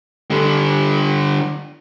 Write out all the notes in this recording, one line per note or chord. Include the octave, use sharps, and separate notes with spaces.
D3 G3